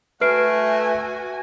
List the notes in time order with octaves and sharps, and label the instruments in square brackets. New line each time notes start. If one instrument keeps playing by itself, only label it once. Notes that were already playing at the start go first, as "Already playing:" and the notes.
[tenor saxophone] A3 [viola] F#4 G#5 [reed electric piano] B4 [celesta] F6 C7 D7